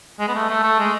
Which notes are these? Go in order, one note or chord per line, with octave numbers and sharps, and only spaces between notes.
G#3
B3
A3
A3
A3
G#3